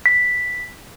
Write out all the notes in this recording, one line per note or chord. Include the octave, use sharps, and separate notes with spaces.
B6